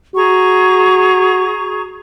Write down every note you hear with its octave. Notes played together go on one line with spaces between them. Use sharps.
F#4 G#4 A#5 C#6